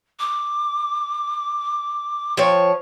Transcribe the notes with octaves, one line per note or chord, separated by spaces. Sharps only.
D6
F3 C#5 G5